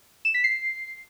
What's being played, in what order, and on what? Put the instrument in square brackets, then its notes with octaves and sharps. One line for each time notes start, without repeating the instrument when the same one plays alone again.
[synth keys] E7
B6
C7